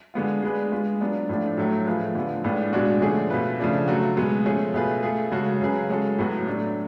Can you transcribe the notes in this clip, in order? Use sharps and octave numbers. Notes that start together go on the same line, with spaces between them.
D3 G#3 B3 F4
G#3 D4 G#4 B4
G#3 B3 F4
F#3 B3 D4 F4
A2 F3 A3 D4
A2 F#3 A3
F3 A3 F4 G#4 B4
D3 F3 B3
A2 G#3 B3 D4 F4
B2 G#3 D4 F#4
D3 F3 A3 C#4 G#4
B2 A3 F4 B4
C#3 F3 A3 D4
F#3 A3 C#4 F#4
B2 G#3 B3
F3 A3 C#4 G#4
B2 A3 F4 G#4 B4
A3 F4 G#4
C#3 G#3 C#4 F#4 A4
C#3 F#3 C#4 G#4 B4
G#3 C#4 F#4 A4
A2 F#3 B3 F#4
F#3 A3 D4